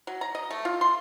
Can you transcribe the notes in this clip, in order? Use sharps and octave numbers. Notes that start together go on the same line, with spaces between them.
F#3
A#5
D#5
A3
F4
C6